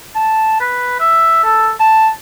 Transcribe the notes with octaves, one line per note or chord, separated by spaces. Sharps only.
A5
B4
E5
A4
A5